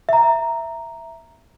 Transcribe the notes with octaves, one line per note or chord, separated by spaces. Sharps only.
E5 A#5